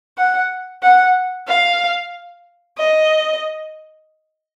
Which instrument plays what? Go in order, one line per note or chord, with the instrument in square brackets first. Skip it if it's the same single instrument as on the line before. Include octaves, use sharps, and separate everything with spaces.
[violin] F#5
F#5
F5
D#5